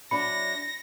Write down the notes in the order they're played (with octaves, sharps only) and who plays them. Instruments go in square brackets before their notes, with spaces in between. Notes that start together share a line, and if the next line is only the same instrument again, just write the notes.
[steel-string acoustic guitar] F#3 D4 E4 [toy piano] B5 [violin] A#6 [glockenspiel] C#7